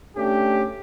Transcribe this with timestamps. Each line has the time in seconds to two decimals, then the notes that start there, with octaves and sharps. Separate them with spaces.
0.17 A3 C#4 D4 G4